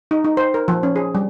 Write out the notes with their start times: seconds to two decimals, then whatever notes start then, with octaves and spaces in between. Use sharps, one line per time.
0.11 D#4
0.24 D#4
0.37 C5
0.54 A#4
0.68 F3
0.83 C#4
0.96 G#4
1.15 G3